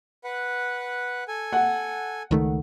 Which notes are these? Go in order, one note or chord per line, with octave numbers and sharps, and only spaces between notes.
B4 F#5
A4 G#5
F#5
C#2 D#3 A3